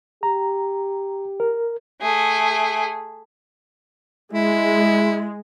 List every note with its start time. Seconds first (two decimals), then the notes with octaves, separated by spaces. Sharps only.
0.23 G4 A#5
1.40 A#4
2.02 A3 G#4
4.33 G#3 E4